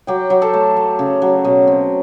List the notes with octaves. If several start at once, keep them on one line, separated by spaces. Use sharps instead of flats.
F#3 G4 G5
F#3
A4 A5
A3
A3
C#3
F#3
B2
C4